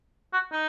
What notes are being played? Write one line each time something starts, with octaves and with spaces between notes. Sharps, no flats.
F#4
D#4